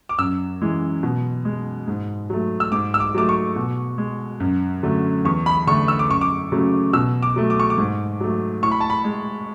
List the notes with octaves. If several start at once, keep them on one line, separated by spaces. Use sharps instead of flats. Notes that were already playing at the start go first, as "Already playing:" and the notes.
D6
F#2 E6
E3 G#3
B2
G#3
G#2
F#3 A3
E6
G#2 D6
E6
D6
F#3 A3 D6
C#6
B2
G#3
F#2
D3 F#3 A3
E2 C#6
B5
D3 A3 C#6
E6
D6
F#2 C#6
D6
C#3 F#3 A3
B2 E6
D6
F#3 A3
D6
C#6
D6
G#2
F#3 A3
A2 C#6
B5
A5
B5
G#3